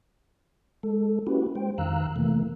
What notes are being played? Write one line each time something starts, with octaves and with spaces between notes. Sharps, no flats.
G#3 A4
A#3 C#4 E4 F#4 G4 B4
G#3 C5 G5
F2 D#3 F5 A#5 E6 F#6
C3 E3 A3 A#3